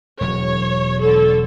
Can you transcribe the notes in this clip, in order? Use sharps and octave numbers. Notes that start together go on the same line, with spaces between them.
E1 F#3 C#5
D3 A4